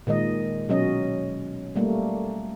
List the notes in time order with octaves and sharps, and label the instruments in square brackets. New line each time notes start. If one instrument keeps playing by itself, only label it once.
[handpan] A#2 D#3 G#3 D#5
B2 F#3 C#4 D#5
G3 A3 A#3